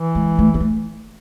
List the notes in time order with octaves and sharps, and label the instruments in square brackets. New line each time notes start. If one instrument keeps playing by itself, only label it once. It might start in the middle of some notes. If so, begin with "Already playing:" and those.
Already playing: [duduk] E3
[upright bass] G#3
A3
B3
A3